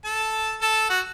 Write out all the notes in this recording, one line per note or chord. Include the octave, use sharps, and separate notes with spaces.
A4 A5
A4 A5
F#4 F#5